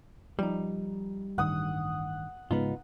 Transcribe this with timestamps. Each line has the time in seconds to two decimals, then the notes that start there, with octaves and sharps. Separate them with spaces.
0.39 F3 G3 D#4
1.38 A1 G2 D#3 F#5 D#6
2.51 G#2 C#3 G#3 B3 D#4 F4